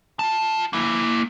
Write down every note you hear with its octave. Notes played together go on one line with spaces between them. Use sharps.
F4 A5
A#3 E4